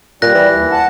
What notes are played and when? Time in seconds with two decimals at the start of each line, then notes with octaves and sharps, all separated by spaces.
0.22 A#2 G3 F#6 A#6
0.35 E3
0.54 D#2
0.72 F#5 A5